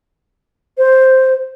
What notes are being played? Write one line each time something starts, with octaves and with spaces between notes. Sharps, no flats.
C5